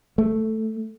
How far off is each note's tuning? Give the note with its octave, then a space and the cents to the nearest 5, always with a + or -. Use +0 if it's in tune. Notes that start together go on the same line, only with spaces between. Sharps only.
A3 +0